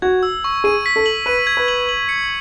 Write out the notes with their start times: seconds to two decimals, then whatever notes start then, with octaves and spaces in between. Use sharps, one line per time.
0.02 F#4 G#6
0.23 E6
0.44 C#6
0.64 G#4 D#7
0.86 B6
0.96 A4
1.06 F#7
1.26 B4 D#7
1.47 G#6
1.57 B4
1.68 F#7
1.89 F#7
2.09 C#7